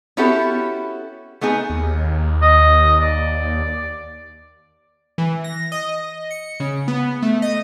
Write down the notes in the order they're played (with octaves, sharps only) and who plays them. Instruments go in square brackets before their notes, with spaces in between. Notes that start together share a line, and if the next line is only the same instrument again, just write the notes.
[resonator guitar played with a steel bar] B3 C#4 E4 F#4 G4 A4
A3 B3 D#4 G#4
[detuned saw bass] D#2
[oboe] D#5
D5
[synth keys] E3
A#6
D#5
C#7
C#3
B3
A3
D#5